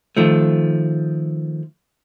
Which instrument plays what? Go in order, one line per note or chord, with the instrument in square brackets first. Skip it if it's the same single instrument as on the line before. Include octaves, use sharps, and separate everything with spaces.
[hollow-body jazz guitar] D#3 F3 A3